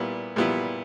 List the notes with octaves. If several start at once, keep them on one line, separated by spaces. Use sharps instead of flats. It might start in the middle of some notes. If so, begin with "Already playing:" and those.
Already playing: A#2 G3 B3 E4
A#2 G3 B3 E4